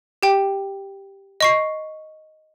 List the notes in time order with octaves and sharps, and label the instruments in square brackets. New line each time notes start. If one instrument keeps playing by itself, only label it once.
[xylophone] G4 G5
D#5 C#6 C7